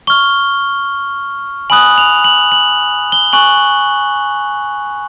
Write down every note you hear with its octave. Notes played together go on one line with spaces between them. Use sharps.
C#6 F6 G7
G#5 B5 D#6 F#6 F#7
F7
F#7
F#7
G7
G#5 C#6 F#6 F#7